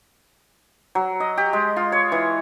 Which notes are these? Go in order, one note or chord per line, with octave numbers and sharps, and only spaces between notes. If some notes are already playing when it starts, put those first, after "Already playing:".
F#3
D#5
G4
G#3
F4
C#5
E3